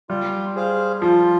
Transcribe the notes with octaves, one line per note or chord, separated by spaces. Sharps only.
G3 F4
G#4 C5 F5
F3 F4